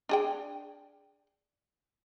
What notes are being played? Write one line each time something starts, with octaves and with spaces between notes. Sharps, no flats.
D4 G#4 G5